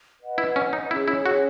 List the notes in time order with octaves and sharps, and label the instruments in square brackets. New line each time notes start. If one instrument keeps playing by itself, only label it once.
[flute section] B4 D#5 F#5
[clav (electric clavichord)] E4
C#4
D#4
[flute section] C#4 G#4 C#5 [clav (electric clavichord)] E4
[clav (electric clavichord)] E4
F#4